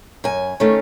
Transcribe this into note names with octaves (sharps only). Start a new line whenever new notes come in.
F#2 G#5
D#3 A3 C#4